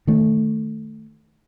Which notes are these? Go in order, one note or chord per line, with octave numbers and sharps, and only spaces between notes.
D#3 A3